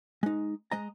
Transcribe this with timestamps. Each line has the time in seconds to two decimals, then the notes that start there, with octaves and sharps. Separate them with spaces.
0.23 G#3 D#4
0.71 G#3 D#5 A#5